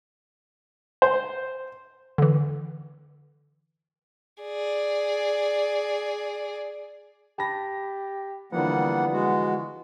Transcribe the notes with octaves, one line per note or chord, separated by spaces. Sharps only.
C5
D3 E3
G#4 D5
G4 A5 B5 A#6
D3 E3 F3 G3 A#3 B3 F#5
G#3 F#4